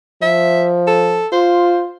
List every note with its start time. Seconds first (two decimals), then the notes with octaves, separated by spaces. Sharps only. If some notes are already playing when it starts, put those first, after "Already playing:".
0.22 F3 E5
0.87 A4
1.32 F4 C5